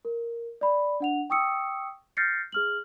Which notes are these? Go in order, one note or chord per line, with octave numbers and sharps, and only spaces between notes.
A#4
D5 B5
D4 F#5 F7
G5 C#6 D#6 E6 C#7
F6 G6 A6 A#6 C7 C#7
G#4 F6 F#7